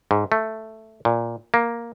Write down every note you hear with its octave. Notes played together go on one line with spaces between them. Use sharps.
G#2
A3
A#2
A#3